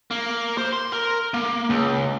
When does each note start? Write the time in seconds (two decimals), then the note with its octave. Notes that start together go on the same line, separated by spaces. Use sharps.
0.11 A#3
0.58 C5
0.73 C6
0.92 A#4
1.34 A#3
1.70 C#2